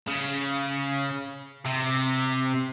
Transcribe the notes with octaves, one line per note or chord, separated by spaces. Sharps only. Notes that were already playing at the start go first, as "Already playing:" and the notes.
C#3
C3